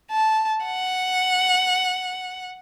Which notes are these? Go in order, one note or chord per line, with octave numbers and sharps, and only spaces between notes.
A5
F#5